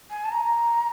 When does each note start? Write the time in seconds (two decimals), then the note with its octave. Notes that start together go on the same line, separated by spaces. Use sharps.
0.10 G#5
0.24 A5
0.31 A#5